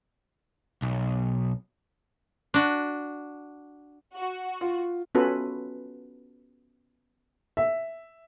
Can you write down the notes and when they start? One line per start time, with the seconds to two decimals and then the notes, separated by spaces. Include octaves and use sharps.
0.82 B1
2.54 D4 F#4
4.15 F#4
4.61 F4
5.15 B3 C#4 F4 F#4 A4 B4
7.57 E5